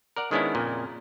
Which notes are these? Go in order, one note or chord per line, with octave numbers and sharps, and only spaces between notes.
A#4 D5 F#5
D#3 G#3 B3 C#4 D4 E4
F2 A#2 C#3 A#3